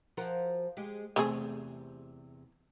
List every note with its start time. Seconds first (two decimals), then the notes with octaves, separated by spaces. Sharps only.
0.17 F3 F#4 A#4
0.77 G#3 G4
1.16 E2 C3 A3 C4 G#4